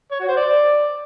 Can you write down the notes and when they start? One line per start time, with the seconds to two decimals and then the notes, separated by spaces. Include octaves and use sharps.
0.11 C#5
0.20 F#4
0.28 C5
0.37 D5